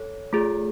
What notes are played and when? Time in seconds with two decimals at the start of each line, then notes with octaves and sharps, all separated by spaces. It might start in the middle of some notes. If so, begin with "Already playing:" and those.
Already playing: A4 C#5
0.33 A3 F4 G#4